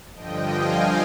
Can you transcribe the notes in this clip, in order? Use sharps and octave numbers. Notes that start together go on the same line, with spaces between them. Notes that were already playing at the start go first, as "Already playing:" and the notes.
G2 D3 F3 D#5 G5
F5 G#5